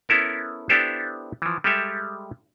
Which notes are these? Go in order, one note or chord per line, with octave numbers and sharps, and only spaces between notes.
B3 C#4 E4 A4 A#4
B3 D4 E4 G4 A4 C5
E3 F3
G3 G#3 G4 A4 E5